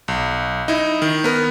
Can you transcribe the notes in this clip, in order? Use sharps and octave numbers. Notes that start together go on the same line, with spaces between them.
B1
D#4 E4
D#3
B3 A#4